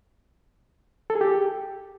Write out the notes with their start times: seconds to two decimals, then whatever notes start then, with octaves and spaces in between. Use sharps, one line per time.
1.10 A4
1.15 G#4
1.21 G4